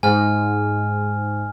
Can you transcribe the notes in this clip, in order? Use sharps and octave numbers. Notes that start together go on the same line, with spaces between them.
G#2 G#5 F6